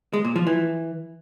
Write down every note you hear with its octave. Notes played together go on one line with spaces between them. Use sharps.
G#3
A#2
F3
E3